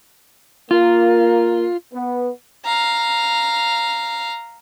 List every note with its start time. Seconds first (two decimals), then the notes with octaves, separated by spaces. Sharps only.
0.71 A#3 F4
1.93 B3
2.65 F5 A#5